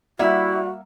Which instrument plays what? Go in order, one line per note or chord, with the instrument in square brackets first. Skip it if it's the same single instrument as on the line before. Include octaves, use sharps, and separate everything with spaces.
[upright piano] G3 [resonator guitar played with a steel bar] A#3 E5 F#5 [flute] E4 [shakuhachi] F#4